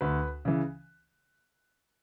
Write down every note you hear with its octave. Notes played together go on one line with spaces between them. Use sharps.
D2 B4
C#3 E3